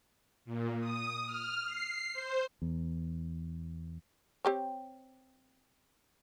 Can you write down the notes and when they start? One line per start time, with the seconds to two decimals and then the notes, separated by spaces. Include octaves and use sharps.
0.45 A#2
0.80 D#6
1.26 F6
1.66 C7
2.13 C5
2.62 E2
4.45 C4 G4 C#5